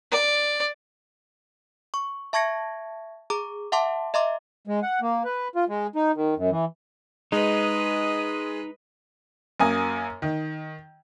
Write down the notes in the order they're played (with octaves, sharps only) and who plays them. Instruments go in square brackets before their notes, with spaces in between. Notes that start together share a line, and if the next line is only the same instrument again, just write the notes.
[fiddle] D5
[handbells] C#6
E5 A5 C#6 G#6 A#6 C#7
G#4 A#5 D6
E5 F#5 A5 C6 D6
D#5 E5 A#5 C6 D6
[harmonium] G#3
F#5
A#3
B4
F4
G#3
D#4
D#3
F#2
E3
[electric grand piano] G#3 [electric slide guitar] D#4 [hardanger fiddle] B4 D#5 [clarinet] D#6
[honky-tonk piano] F#2 A#3 G#5 D#6
D#3